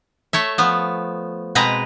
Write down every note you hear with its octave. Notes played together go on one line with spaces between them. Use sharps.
A3 C#5 E5
F3 B3
B2 G#3 C4 B4 A#5